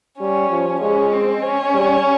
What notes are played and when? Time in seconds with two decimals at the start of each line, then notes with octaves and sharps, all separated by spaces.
0.20 G3 C#4
0.50 F3
0.81 G#3 C#4
1.12 C4
1.43 C#4
1.74 G3